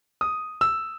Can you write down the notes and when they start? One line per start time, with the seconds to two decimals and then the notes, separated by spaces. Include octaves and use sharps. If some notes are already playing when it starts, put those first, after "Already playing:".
0.21 D#6
0.61 E6